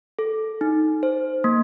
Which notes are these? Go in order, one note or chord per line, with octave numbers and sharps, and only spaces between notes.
A4
D#4
C5
A#3